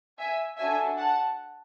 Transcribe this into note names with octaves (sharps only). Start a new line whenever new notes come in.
E5 G#5
D4 F#4 A4 E5 G#5
F#5 A5